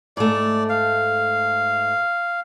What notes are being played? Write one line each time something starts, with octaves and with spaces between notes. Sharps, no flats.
G#2 A3 D5
F5